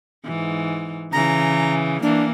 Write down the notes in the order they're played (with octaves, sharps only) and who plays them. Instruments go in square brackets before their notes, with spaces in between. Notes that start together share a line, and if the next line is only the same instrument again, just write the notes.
[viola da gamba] G#2 E3
[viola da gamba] C#3 E3 [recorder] A#5
[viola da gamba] E3 A#3 [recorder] D4